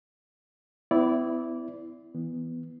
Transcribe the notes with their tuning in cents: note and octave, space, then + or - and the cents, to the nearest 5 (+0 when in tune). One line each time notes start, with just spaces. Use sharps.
B3 +40 E4 +0 D5 -20
E3 +0 B3 +0